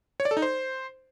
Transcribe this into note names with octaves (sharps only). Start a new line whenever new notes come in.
C#5
D5
A4
D#4
C5